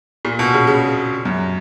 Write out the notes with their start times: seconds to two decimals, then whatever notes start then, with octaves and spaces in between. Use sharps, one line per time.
0.25 A#2
0.39 B2
0.54 C#3
0.67 C#3
1.25 F#2